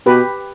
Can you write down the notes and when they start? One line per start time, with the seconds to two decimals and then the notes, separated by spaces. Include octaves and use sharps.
0.06 B2 G4 B4